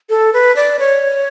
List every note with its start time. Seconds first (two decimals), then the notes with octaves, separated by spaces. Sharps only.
0.10 A4
0.33 B4
0.56 D5
0.79 C#5